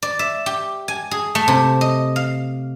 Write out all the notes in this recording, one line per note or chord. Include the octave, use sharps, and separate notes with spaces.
D5
E5
G4
G#5
G#4
A3
C3
D#5
F5